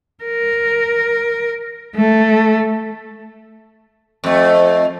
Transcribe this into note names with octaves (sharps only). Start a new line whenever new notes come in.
A#4
A3
F2 A3